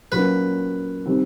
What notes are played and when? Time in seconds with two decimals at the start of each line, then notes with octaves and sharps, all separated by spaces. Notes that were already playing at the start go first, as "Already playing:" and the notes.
0.12 A#2 F#3 A#3 C#4 B4
1.06 D#3 G3 C4